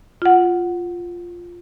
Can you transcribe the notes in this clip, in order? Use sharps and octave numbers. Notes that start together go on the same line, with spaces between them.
F4 F#5